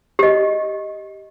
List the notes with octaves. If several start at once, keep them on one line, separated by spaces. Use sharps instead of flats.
G4 D#5